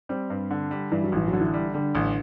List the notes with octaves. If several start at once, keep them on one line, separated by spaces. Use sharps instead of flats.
G3 C4
G2
D3
G3
G2 E3
F#3
A1 E3
F#3
D3
E3
G3
D3 G3
A1